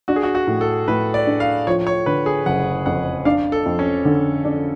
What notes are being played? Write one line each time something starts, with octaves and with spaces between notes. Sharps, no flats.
D4 F#4
G#4
F#4
F#4
A2
A4
A2 B4
D5
D4
F5
F3 C#5
C#5
D3 B4
G#4
F#1 F#5
F2 F#5
D4 F5
A4
F2
C#4
D3
D4